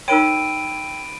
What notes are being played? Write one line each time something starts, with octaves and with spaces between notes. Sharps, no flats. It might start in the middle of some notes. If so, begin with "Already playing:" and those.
D#4 A#4 C#5 G5 B5 E6 D7 D#7